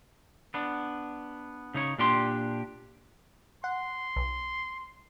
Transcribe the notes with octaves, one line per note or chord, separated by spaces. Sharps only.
B3 D4
C#3 D#4 C#5
A#2 D4 G4 C6
F#5 C6
B1